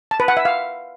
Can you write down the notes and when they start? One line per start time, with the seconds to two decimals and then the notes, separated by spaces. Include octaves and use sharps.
0.11 A5
0.20 B4
0.28 F#5
0.37 E5
0.45 F5